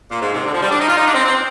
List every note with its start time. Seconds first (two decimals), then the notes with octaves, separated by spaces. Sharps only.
0.11 A#2
0.22 G#2
0.34 C3
0.45 D3
0.54 F3
0.63 G3
0.71 D4
0.80 D#4
0.88 F4
0.97 D#4
1.06 D4
1.15 C4
1.26 C4